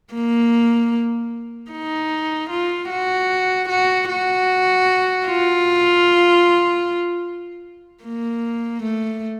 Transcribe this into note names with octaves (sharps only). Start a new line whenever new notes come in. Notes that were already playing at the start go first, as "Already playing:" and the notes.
A#3
D#4
F4
F#4
F#4
F#4
F4
A#3
A3